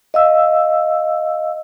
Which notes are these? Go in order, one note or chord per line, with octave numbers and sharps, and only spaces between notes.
D#5 F5 E6